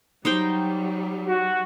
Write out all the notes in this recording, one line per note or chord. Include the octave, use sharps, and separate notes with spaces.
F#3 G3 D#4 C5 G5
F#4